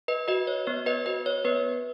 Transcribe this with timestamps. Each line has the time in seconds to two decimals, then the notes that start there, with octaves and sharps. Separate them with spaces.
0.08 B4 D#5
0.28 F#4 B4 D#5
0.47 C#5
0.67 B3 C#5
0.86 B4 D#5
1.06 F#4 B4 D#5
1.26 C#5
1.44 B3 B4